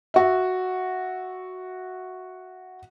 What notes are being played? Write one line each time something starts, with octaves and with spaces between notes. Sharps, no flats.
F#4 E5